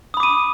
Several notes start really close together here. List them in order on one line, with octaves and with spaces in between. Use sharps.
D#6 B5 D6 D#7